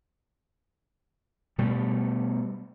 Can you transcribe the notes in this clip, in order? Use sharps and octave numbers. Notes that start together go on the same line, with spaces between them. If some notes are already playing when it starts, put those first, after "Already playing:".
B2 G3 A3